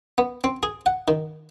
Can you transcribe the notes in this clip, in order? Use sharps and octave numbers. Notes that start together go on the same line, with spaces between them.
B3
C4
G#4
F#5
D#3